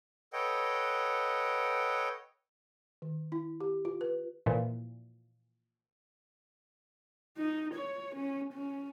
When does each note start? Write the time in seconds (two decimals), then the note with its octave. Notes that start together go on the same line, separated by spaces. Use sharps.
0.33 A4 B4 C#5 D#5 F#5 G5
3.02 D#3
3.32 E4
3.60 G4
3.85 F4
4.01 B4
4.46 A#2 E3 F3
7.37 D#4
7.74 C#5
8.15 C#4
8.53 C#4